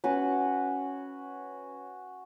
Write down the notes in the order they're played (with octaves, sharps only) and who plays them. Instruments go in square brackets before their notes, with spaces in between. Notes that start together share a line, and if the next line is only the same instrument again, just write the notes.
[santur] C#4 F#4 B4